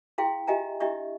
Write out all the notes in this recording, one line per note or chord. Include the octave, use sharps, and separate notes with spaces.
E4 G#4 F5 G5 C6
F4 G4 D#5 E5 G#5 A#5
D4 E4 G4 D#5 E5 C#6